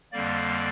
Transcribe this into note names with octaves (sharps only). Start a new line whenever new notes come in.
F2 D3 G3 A#3 D5